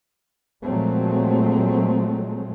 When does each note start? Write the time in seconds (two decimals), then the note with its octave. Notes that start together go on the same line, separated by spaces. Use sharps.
0.63 A#2 F3 F#3 G#3 A3 C4